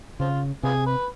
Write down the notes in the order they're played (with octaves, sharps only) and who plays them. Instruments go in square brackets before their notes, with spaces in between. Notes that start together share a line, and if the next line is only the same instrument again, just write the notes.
[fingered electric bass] C#3 [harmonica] C4 F4
[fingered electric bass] C3 [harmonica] B3 F4 G#4
[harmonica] B4